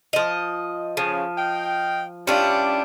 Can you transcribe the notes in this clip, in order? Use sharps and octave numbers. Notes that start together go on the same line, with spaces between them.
F3 D#5
C#3 F3
D#5 F5 G5
G2 C#4 D4 E4 F4 G4